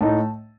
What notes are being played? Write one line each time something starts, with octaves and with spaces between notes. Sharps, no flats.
A2 A3 D#4 A5